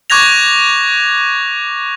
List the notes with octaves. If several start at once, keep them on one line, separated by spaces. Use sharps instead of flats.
C#6 D6 F#6 G#6 A#6 F7